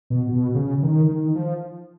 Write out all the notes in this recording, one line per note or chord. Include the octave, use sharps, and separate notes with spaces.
B2
B2
C#3
D#3
D#3
F3